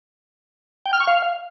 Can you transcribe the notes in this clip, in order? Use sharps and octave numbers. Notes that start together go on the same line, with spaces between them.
G5
F6
C#6
F5